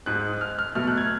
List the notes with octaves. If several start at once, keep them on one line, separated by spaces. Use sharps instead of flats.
G#2 G#3 F#6
F6
F6
B2 F#3 A3 F6
F#6
G#6